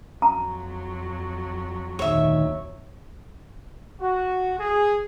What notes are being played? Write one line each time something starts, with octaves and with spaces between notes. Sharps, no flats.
F2 F#3 A#5
D2 A#2 D#3 C#5 E5
F#4
G#4